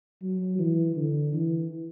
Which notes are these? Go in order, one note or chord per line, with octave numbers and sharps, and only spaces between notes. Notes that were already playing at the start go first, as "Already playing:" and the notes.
F#3
E3
D3
E3